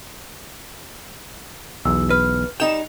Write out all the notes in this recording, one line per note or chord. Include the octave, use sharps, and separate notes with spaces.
B1 E2 E6
B4 F6
G3 D#4 G5 E7 F7